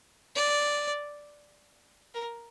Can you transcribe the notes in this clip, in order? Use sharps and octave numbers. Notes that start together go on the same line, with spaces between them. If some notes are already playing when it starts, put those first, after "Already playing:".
D5
A#4